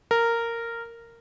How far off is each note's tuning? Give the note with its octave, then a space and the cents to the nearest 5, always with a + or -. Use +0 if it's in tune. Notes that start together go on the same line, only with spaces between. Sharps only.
A#4 -10